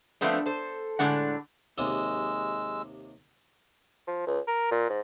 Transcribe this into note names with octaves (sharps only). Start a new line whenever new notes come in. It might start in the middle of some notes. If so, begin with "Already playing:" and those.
F3 A3 B3 C4 D4
A4 C5
A2 D3 G#3 D4 F#5
D#2 C3 G#3 C6 E6
F3
C#2
A#4
A#2
G#2